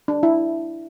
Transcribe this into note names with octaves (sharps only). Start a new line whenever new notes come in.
D4
E4